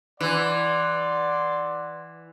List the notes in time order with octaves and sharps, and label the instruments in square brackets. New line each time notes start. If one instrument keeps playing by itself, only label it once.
[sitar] E3 [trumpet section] D5 F#5 C6